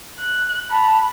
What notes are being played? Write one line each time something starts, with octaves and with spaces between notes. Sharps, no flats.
F#6
A5 B5